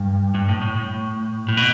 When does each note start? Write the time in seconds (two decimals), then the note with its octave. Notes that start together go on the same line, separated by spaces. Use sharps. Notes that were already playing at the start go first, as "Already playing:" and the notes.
Already playing: G2
0.34 G2
0.49 A2
0.62 A2
0.76 A2
1.49 A2
1.57 B2